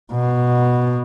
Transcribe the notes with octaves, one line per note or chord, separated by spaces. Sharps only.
B2